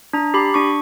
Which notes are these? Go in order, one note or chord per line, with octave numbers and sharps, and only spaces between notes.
D4 A#5
G4 B5
D4 C#6